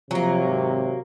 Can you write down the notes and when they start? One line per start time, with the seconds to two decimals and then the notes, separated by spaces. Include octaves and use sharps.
0.11 C3 F3 F#3 A#3
0.44 G#1